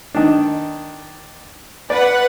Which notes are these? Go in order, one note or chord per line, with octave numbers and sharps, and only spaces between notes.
D#3 D4
B4 D5 F#5